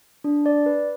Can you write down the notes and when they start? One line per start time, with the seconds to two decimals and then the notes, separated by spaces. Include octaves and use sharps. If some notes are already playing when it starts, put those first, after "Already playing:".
0.24 D4
0.46 D5
0.66 B4